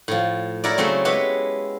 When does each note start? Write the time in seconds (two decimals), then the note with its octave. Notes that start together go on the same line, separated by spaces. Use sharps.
0.08 A2 F3
0.64 E4 F#4 A#4 C#5 D5
0.78 C#3 F#3 A3 C4 C#4
1.05 G#3 B3 E4 G4 B4 C#5